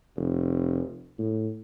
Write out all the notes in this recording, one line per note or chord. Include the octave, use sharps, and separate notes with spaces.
F1
A2